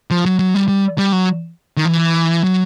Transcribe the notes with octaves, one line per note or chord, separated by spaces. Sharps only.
F3
F#3
F#3
G3
G3
G3
F#3
D#3
E3
F#3